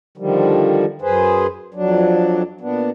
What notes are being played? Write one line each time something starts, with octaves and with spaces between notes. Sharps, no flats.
D3 D#3 F3 G3
F#2 G#4 B4 C5
F2 F#3 D4
A#2 B3 D4